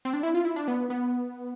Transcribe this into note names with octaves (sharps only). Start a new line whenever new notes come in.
C4
D4
E4
F4
E4
D4
B3
B3